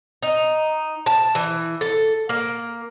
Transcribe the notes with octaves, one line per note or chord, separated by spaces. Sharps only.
D#4
A5
E3
A4
A#3